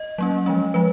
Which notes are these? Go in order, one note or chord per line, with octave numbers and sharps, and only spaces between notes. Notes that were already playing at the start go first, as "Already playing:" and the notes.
Already playing: D#5
F#3 A#3 C#4
F3 G#3 C#4
F3 G#3 B4